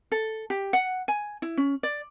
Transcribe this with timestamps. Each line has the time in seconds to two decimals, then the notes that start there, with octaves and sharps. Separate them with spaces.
0.12 A4
0.50 G4
0.73 F#5
1.08 G#5
1.42 E4
1.57 C#4
1.83 D5